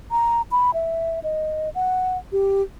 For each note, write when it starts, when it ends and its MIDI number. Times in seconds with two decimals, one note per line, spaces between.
0.11 0.42 82
0.52 0.74 83
0.74 1.20 76
1.24 1.69 75
1.75 2.18 78
2.32 2.62 67